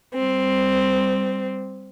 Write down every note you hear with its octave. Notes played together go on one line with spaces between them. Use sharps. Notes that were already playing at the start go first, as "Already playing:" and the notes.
G3 C4